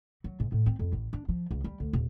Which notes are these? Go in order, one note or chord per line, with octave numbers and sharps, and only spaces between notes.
F#3
G#2
A2
C4
F2
A1
D4
F3
C#2
G3
D2
D#1